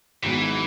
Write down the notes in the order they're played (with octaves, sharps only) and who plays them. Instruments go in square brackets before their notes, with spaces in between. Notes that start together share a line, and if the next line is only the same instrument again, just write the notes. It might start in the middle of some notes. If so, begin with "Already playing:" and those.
[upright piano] G#1 G#2 F#3 B3 [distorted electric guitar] E3